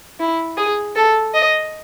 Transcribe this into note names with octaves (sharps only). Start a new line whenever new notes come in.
E4
G#4
A4
D#5